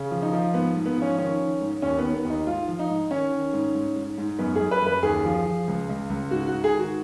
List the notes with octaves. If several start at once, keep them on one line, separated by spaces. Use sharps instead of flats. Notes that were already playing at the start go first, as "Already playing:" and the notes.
Already playing: C#3
F3
D#4
F3
G#2 B3
G#2
B3
F3 C#4
D#3 C#4
D#3
G#2
D#2 C#4
B3
D#3
B3
D#2
D#4
G#2 F4
F3
D#4
G#2
D#3 C#4
D#3
G#2
G#2
G#2
G#2
F#2 B3
F#2 G#4
B4
F#2 B4
D#2 G#4
F3
F3
C#2
C#2
C#2
G#2 F#4
F#4
G#2
G#4
D#3 F#4